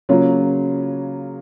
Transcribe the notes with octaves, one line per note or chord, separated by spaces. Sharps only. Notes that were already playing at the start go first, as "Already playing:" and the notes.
C#3 F#3 A#3 C#4 F4